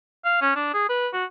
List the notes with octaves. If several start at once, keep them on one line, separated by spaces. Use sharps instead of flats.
F5
C#4
D4
G#4
B4
F#4